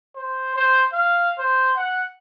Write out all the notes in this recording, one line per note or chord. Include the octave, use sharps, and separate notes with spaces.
C5
C5
F5
C5
F#5